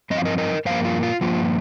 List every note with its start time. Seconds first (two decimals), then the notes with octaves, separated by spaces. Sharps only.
0.10 G2 F3 C4 D#5
0.17 F5
0.25 A#4 D#5
0.38 A#4 D#5
0.65 G2 F3 A#3 C5 F5
0.85 F4
1.03 F4
1.21 G2 F3 A#3 F4